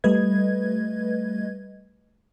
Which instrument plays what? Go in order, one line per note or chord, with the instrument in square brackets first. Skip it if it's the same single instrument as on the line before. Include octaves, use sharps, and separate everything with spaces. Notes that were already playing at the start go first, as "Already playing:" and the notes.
[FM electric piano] G3 A3 B4 D#5 G#6